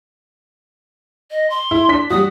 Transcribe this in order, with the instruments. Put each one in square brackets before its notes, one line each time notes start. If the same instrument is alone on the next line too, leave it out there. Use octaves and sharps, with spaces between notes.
[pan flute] D#5
C6
[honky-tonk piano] E4
D4 B6
[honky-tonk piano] G3 F#4 [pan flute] D#6